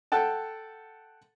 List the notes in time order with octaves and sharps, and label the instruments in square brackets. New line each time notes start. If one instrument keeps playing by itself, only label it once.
[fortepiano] A4 F#5 G5 A5